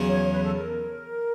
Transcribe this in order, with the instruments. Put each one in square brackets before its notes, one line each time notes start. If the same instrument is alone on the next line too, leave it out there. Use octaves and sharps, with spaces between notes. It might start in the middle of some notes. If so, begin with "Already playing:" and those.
Already playing: [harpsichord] E2 C#3 F#3
[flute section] C#5
B4
A4
A#4